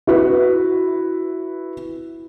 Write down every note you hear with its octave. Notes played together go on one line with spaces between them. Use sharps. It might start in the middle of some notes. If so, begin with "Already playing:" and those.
E4 F#4 B4